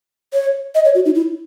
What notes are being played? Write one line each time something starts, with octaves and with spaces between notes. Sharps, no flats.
C#5
D#5
C#5
F#4
D#4
E4